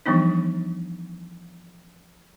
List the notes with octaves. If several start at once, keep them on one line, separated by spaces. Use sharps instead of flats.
E3 F3 G3 B3 D4 D#4